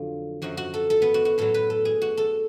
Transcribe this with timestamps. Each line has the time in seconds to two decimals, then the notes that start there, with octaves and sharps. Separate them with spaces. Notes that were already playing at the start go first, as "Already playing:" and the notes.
Already playing: F2 D3 F#3 F4
0.42 F#2 F3 F#4
0.57 F#4
0.74 A4
0.90 A4
1.02 B3
1.14 F#4
1.25 F#4
1.38 A2 F#3 A4
1.54 B4
1.70 A4
1.85 G#4
2.02 F#4
2.17 A4